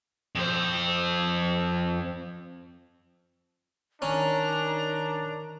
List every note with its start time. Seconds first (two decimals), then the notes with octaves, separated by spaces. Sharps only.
0.35 F2 C5
4.02 D#3 C#4 D4 A#5